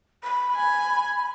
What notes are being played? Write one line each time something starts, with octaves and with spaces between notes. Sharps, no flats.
B5
G#5